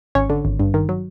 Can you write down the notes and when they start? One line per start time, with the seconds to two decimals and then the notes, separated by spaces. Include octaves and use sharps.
0.15 G#1 C#4 C#5
0.30 D3
0.45 G#1
0.60 G2
0.74 D#3
0.89 F#3